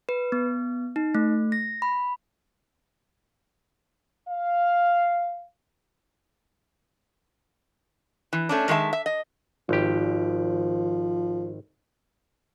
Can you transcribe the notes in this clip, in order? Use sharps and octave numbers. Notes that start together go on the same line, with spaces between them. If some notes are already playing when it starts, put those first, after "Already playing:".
B4
B3
D#4
A3
A#6
B5
F5
E3
A3 C#4 D4
D#3 G#3 G#4 E5 A5
E5
D#5
G#1 F3 G4